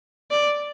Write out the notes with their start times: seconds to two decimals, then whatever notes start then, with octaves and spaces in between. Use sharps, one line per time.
0.31 D5